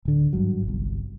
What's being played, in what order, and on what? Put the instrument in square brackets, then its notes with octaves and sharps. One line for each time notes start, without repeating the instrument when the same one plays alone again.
[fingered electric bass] D1 D3
G#1 G2 F#3
G1 C2